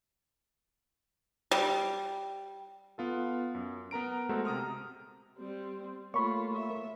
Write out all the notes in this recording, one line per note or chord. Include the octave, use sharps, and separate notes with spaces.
G3
B3 F4 A4
F#2
B3 A#4 A#5 D7
G#3 A3 F#4 A4 A#4 C5
C3 A#5 D#6 F6
G3 C4
A3 A#3 F4 C#5 B5 C#6
E5